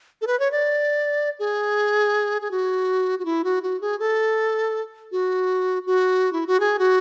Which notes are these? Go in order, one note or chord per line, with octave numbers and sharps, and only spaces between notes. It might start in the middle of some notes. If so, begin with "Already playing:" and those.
A4
B4
C#5
D5
G#4
G#4
F#4
F#4
E4
F#4
F#4
G#4
A4
F#4
F#4
E4
F#4
G#4
F#4